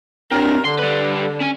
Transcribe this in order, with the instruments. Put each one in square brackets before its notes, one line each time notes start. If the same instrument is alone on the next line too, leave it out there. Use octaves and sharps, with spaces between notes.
[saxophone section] G2 F#3 A#4 [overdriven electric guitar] C4 D4
[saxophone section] D3 [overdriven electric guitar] C6
[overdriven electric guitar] G3 B4
C#4 G#5